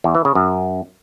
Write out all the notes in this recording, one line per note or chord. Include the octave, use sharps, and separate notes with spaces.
E2
E3
C#3
F#2